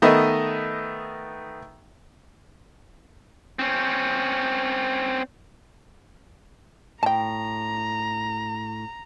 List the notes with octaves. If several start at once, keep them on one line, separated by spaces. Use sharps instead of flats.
D#3 A3 B3 D#5 E5
C4 C#4
A2 G5 A5 A#5